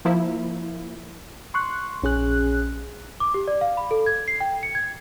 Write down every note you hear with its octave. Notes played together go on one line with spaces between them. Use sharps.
F3 A#3 E4
C6 C#6 F#6
A#1 C#4 G#4 F#6
D6
G4
D5
F5
B5
A4
G#6
C7
G5
C#7
G#6